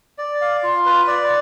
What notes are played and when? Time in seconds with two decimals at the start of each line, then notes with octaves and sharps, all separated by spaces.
0.18 D5
0.41 F5
0.63 F4
0.86 B4
1.07 D5